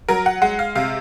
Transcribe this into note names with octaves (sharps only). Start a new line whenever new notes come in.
F#3 A#4
F#5
G#3 F#5
F5
C3 F5